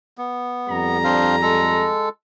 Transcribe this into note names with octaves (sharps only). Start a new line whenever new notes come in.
B3
F2 G3 A#5
C4 D4 F5
G#3 A4